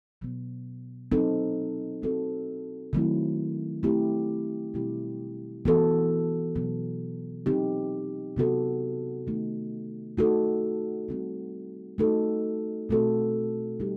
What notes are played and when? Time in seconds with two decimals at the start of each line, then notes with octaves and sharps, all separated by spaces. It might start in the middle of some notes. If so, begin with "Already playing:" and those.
0.21 B2 F#3 B3
1.12 F#3 C4 D#4 A4
2.02 F#3 C4 F#4 A4
2.93 D#3 F#3 A3 C4 E4
3.83 A3 C4 E4 G4
4.74 B2 G3 C4 E4 G4
5.65 E3 B3 F#4 A4
6.55 B2 F#3 B3
7.46 F#3 C4 D#4 G4
8.37 C3 F#3 B3 F#4 A4
9.27 D#3 A3 D#4
10.17 A3 D#4 F#4 A4
11.08 G3 C4 F#4
11.98 A3 D#4 F#4 A4
12.89 B2 A3 C4 F#4 A4
13.80 G3 D#4 G4